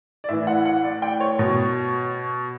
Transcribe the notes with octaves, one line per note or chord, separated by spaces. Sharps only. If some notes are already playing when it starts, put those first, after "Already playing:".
D5
A2 E3 E5
F#5
F#5
D5
G5
C#5
B2